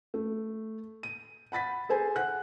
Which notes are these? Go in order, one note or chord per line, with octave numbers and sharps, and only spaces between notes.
A3
D#7
F#5 B5 A6 B6
G#4 A4 C5 G#5
F#5 F#6